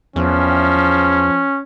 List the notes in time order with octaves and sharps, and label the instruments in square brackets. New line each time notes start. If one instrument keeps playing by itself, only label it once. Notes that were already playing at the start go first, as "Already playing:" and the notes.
[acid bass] E2 [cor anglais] F3 [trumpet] C#4